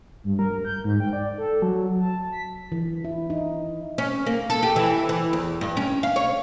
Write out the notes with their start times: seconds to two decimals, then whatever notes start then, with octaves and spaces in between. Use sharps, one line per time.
0.24 G2
0.39 A#4
0.65 G6
0.84 G#2
1.00 G5
1.13 D5
1.38 A4
1.62 F#3
2.00 A5
2.32 B6
2.72 E3
3.04 E4
3.30 D#4
3.98 C#4
4.26 A#3
4.50 A4
4.63 G4
4.76 E3
5.09 E3
5.33 E2
5.61 G2
5.77 C#4
6.03 F5
6.16 C#5